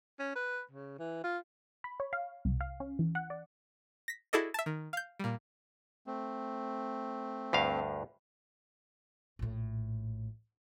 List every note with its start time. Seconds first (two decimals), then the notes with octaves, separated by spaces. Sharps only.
0.19 C#4
0.35 B4
0.71 C#3
0.99 E3
1.24 F4
1.84 B5
2.00 C#5
2.13 F5
2.45 C2
2.61 F5
2.80 C#4
2.99 E3
3.15 F#5
3.30 D5
4.08 A#6 B6
4.33 E4 F#4 G#4 A4 D5 D#5
4.54 E5 A5
4.66 D#3
4.93 F5 G6
5.20 A#2 G3
6.07 A3 C4
7.53 D2 G2 F5
9.39 A#1 A2